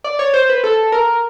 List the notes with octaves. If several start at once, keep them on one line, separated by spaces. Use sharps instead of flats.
D5
C#5
C5
B4
A4
A#4